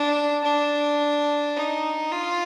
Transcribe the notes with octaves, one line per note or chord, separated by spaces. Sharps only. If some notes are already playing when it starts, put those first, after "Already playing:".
Already playing: D4
D4
D#4
F4